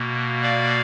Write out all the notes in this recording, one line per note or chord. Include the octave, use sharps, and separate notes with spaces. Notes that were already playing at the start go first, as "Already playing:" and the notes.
Already playing: B2 A#3
D5 F5